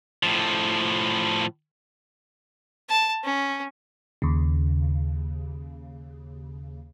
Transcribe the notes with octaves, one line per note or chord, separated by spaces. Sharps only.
A2 F3
A5
C#4
D#2 C#3